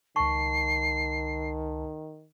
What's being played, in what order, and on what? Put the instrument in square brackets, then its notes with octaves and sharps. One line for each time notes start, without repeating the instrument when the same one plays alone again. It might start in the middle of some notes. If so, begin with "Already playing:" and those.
[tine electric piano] C#2 A5 [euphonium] D#3 [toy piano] C#6 [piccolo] C7